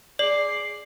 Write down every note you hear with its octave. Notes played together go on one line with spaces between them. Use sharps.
G#4 D5 D6 C7 F#7